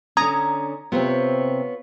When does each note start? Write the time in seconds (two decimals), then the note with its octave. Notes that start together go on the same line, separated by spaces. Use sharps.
0.17 D3 C#4 A#5 D#6 G#6
0.92 C3 B3 C4 F4 C#5